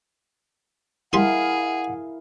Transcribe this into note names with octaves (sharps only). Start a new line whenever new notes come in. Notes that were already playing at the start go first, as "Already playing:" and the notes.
G3 E4 G#4 A#4 F5 F#5 C6 D#6